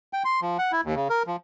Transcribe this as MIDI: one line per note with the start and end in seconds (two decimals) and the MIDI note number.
0.13 0.23 79
0.25 0.40 84
0.42 0.57 53
0.59 0.72 78
0.72 0.81 64
0.84 0.95 39
0.96 1.08 49
1.10 1.23 70
1.27 1.36 53